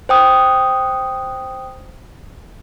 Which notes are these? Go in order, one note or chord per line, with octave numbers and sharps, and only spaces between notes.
C5 G5 D#6